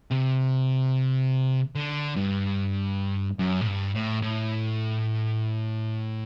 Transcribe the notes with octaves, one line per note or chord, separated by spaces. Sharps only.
C3
D3
G2
F#2
A2
G2
A2
A2